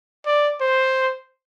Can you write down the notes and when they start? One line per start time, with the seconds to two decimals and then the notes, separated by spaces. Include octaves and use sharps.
0.26 D5
0.61 C5